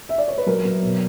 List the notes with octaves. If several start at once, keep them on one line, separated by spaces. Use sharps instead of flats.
E5
D5
C#5
B4
F#3 A#4
F#3
B2